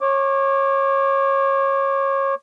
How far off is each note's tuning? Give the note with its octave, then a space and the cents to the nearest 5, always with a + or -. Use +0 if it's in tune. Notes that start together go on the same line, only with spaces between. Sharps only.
C#5 -25 D6 +0